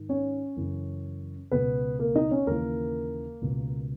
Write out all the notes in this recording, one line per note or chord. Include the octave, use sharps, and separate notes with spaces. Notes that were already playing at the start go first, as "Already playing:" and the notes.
Already playing: G#2 D#3
C#4 C#5
F#2 C#3 E3
C#2 B2 B3 B4
A#3 A#4
D#4 D#5
C#4 C#5
D#2 C#3 E3 A#3 A#4
C#2 B2